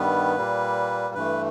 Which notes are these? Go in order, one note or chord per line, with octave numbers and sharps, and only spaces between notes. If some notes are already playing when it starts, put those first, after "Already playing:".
Already playing: G2 D#3 G3 B3 B4
A#2 G3 A#3
G2 E3 A3 B4